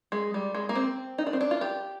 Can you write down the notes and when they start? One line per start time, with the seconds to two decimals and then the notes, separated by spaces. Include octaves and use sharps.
0.12 G#3
0.34 G3
0.54 G#3
0.69 A#3
0.75 C4
1.18 D#4
1.27 D4
1.33 C4
1.41 D4
1.51 F4
1.61 G4